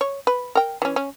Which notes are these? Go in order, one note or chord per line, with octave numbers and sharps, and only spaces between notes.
C#5
B4
A#4 G5
E3 C#4
C#4